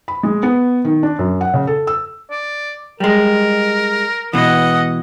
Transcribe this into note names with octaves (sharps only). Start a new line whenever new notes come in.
B5
G#3
B3
D#3
D4
F#2
F#5
C#3
A4
E6
D5
G3 G#3 A#4
B2 E3 D#5 F#5